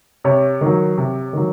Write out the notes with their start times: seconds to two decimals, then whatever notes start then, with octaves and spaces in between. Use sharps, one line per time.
0.24 C3 C#5
0.61 D#3
0.66 F#3
0.97 C3
1.33 D#3 F#3